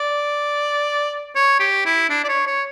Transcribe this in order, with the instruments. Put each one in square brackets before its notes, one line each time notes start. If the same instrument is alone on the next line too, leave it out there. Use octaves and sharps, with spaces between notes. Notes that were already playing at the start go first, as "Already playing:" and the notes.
Already playing: [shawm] D5
C#5
G4
E4
D4
D5
C#5
C#5